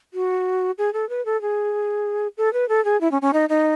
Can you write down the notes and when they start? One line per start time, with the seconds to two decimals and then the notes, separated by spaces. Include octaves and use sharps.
0.14 F#4
0.78 G#4
0.93 A4
1.09 B4
1.25 A4
1.42 G#4
2.37 A4
2.53 B4
2.69 A4
2.85 G#4
3.01 E4
3.12 C#4
3.22 C#4
3.33 D#4
3.49 D#4